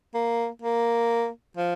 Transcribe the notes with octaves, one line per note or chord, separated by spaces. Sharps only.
A#3
A#3
F3